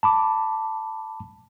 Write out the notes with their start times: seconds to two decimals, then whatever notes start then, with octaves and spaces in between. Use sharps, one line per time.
0.03 A5 B5 D6